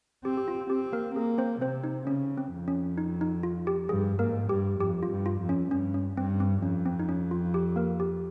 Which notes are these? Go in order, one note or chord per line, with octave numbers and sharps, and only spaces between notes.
C4 G4
G4
F4
C4 G4
A#3 A#4
A#3 G#4
C4 C5
C3 C4 C5
D#4
C#3 C#4
C4
F2
C#4
D#4
D#4
F4
G4
G2 G#4
G#2 A#3 A#4
G2 G4
F2 G4
F4
G2
F4
F2
C#4
G2 C#4
C#4
G2 C4
C4
F2 C#4
C4
D#4
C#4
F4
G4
A#3 A#4
G4